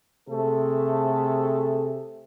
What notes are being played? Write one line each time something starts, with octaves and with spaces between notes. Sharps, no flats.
C3 A3 G#4 A4